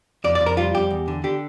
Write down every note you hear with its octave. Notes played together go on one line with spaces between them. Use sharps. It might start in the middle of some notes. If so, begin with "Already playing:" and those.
F2 D5
D5
F2
A#4
G3 F4
F2 G4
E2
D3
D3 G4